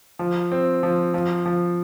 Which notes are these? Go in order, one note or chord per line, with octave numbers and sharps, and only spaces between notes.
F3
C4
F3
F3
F3